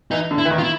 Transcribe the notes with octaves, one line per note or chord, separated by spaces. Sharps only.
E3 D#4
D3
E4
E3
D#3
F4
E4